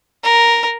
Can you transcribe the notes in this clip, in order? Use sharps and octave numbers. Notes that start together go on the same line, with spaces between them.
A#4